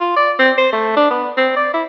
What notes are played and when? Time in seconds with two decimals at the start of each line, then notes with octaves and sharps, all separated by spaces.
0.01 F4
0.16 D5
0.39 C4
0.58 C5
0.72 A3
0.96 D4
1.10 B3
1.37 C4
1.56 D5
1.74 E4